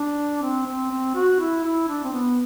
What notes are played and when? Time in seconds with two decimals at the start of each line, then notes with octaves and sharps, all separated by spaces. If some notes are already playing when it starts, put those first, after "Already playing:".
Already playing: D4
0.42 C4
0.66 C4
0.91 C4
1.15 F#4
1.40 E4
1.64 E4
1.89 D4
2.04 C4
2.13 B3